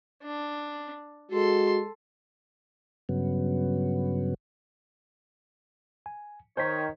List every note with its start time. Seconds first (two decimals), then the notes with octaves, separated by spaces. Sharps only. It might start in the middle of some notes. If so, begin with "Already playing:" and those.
0.23 D4
1.32 G#3 F#4 A4 C6
3.09 G2 C#3 F#3 B3
6.06 G#5
6.57 D#3 C5 C#5 G6 B6